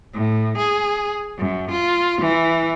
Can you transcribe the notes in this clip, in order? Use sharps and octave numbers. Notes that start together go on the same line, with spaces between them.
A2
G#4
F#2
F4
E3